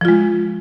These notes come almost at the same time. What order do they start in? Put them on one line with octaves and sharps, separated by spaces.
F3 F4 G#3